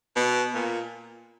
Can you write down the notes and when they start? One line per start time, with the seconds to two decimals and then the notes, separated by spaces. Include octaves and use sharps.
0.16 B2
0.54 A#2